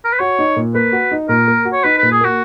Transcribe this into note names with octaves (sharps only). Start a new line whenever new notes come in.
A#4
B4
F#4 C#5
D#4
A#2
A#3 B4
F#4
D#4
A#2 A#4
A#3
F#4
C#5
D#4 B4
A#2 B4
G#4
A#3 F#4